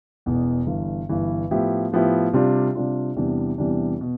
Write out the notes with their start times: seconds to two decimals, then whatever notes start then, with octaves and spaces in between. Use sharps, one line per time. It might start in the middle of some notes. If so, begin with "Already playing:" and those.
0.26 E1 E2 B2 B3
0.67 G1 G2 E3
1.09 G1 G2 E3
1.51 A2 F3 B3 E4 G4
1.92 A2 F3 B3 E4 G4
2.33 C3 G3 D4 F4
2.75 C3 G3 D4 F4
3.17 E2 C3 E3 G3 D4
3.58 E2 C3 E3 G3 D4
4.01 B2